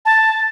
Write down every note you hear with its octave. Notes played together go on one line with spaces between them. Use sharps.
A5